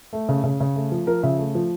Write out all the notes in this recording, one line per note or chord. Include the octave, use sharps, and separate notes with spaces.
A3
C#3
C#3
C#3
A3
F3
F3 A#4
C#3 E5
A3
F3